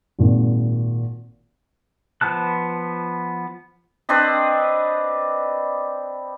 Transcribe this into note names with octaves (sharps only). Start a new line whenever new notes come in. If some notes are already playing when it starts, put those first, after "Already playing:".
G#1 A#2
F3 B3 A5 F#6
C4 D4 B4 D#5